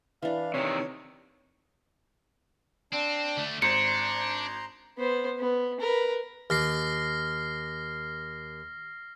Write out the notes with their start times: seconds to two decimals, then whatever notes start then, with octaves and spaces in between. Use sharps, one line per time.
0.22 E3 D4 F5
0.54 C3 D#3 C#5
2.93 C4 D4
3.37 D3 A3
3.62 G#1 D4 C5 A#5 C6 C#7
4.98 B3 C5
5.39 B3
5.80 A#4 B4
6.50 D#2 F6 A#6 C7